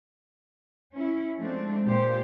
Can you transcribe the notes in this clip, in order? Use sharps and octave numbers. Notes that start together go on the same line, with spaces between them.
C#4 E4
F3 G#3 A3 C4 D4
A#2 G4 C5